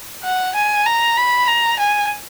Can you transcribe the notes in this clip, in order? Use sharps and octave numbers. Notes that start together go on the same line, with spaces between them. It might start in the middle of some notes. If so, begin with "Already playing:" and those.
F#5
G#5
A#5
B5
A#5
G#5